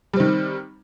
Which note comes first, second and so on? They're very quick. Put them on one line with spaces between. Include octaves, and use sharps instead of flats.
G3 C4 D#3